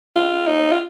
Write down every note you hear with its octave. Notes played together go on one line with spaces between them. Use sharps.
F4
D#4
F4